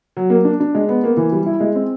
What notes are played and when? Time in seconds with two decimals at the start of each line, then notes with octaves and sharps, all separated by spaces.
0.17 F#3
0.30 A#3
0.45 D4
0.60 D4
0.75 G#3
0.89 B3
1.04 A#3
1.17 E3
1.32 G3
1.46 E4
1.60 G#3
1.75 C4